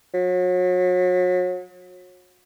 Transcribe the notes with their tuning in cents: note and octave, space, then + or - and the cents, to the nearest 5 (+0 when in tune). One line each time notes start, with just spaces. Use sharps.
F#3 -35